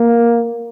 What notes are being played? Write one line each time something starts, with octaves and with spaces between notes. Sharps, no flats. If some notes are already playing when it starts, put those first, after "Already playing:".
Already playing: A#3